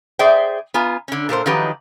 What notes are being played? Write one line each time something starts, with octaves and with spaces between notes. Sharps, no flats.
G#4 C5 D5 E5 G5
B3 F4 G#5 A#5
D3 C#4
A#2 A4 A#4 C5
D#3 F3 F#3 D#4 G4 B4